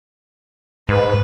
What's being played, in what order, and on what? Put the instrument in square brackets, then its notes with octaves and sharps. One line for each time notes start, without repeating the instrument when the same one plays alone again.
[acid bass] G#2 [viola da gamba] B4